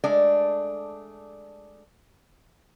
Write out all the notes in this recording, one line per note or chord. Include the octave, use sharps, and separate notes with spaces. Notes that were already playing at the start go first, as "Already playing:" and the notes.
G#3 A3 D4 D5